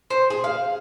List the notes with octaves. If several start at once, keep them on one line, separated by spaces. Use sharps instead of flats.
C5
G#4
F5